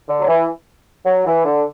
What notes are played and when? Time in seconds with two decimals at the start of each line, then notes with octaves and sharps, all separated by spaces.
0.09 D3
0.21 F#3
0.28 E3
1.05 F#3
1.26 E3
1.45 D3